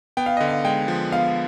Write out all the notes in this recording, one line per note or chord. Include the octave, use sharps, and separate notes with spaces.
B3 G5
F5
D3 D#5
F5
G#3 G5
F3
B3 F5